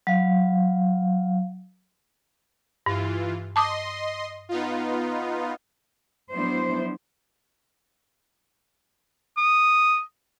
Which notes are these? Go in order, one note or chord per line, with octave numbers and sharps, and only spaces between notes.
F#3 F5
G2 E3 F4
D#5 A5 C6 D6 D#6
B3 D#4 F4
F3 F#3 B3 D4 E4 C5
D#6